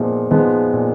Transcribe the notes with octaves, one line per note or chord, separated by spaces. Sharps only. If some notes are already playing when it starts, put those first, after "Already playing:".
Already playing: A#2 F3 G#3 B3 D#4
F3 G#3 B3 D#4
A#2